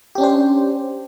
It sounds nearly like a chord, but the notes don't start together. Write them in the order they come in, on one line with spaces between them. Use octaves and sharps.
G4 C#4 D4 C5